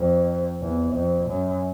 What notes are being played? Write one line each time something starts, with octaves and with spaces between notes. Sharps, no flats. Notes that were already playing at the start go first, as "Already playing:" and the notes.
Already playing: F2
E2
F2
F#2